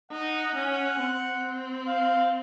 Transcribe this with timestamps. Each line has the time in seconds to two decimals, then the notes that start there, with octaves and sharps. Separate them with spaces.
0.11 D#4 F#5
0.55 C#4
0.99 C4
1.87 F5